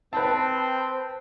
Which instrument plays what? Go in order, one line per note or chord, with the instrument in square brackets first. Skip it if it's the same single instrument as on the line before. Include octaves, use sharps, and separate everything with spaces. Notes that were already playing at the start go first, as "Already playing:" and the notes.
[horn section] C4 [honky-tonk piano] B4 A5